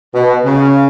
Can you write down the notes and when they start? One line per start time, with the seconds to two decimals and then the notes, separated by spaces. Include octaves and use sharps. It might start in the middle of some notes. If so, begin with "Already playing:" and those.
0.14 B2
0.44 C#3